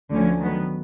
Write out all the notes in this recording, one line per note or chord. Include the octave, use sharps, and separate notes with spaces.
D2 D3 F3 A3 C#4
D#3 F#3 B3